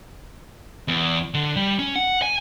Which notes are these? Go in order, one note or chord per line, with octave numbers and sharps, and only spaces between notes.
E2
D3
G3
C#4
F#5
G#5